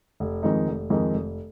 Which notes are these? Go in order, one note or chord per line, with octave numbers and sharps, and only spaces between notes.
F1
F2 D#3 G#3 D#4
F1
F2 D#3 G#3 D#4
F1